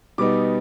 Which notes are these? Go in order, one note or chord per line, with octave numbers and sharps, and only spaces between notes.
B2 G3 B3 D#4 D6